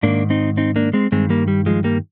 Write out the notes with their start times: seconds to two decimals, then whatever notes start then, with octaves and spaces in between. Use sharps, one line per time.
0.03 G#2 D#3 A#3 D4
0.30 C4 D#4
0.57 C4 D#4
0.76 A#3 D4
0.93 G#3 C4
1.12 G2 D#3 G#3 C4
1.30 G3 A#3
1.48 G3
1.66 F3 G#3
1.84 G3 A#3